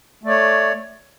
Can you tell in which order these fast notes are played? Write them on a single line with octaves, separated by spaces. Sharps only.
A3 D5 C#5